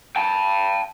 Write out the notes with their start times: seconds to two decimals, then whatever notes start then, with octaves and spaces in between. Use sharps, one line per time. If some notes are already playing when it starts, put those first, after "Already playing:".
0.16 G5 A5